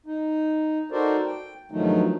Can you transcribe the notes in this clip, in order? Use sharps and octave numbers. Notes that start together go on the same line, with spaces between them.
D#4
D#4 F#4 A4 A#4 C5 D5
G5
G2 D#3 F3 F#3 A3 D#4